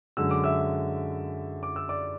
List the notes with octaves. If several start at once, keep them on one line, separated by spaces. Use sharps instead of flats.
F#2 D3 G#3 E6
D6
E5 E6
D6
E6
D5 D6